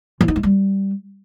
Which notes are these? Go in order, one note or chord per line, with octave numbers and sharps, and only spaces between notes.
E3
D#4
A3
G3